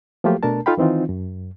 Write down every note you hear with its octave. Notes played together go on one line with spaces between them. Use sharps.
F3 F#3 A3 A#3 F4 G4
B2 A3 D4 A#4 A5
D#4 F4 A4 F5 G5 B5
D#3 E3 C4 D#4 F4
F#2